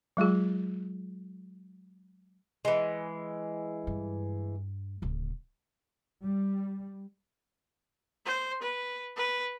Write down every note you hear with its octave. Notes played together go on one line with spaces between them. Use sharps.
F#3 G#3 F4 G#4
E3 G#3
G2
D1 C#3
G3
C5
B4
B4